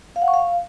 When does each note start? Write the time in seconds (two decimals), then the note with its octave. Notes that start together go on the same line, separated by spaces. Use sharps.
0.16 F5
0.22 F#5
0.28 C#6
0.34 F5